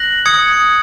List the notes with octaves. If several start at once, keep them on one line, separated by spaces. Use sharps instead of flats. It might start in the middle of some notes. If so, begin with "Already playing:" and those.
Already playing: F#6 A#6 F#7
D#6 G#6 C#7